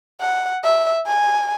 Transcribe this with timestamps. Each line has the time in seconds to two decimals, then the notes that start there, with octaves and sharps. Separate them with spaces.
0.21 F#5
0.64 E5
1.07 G#5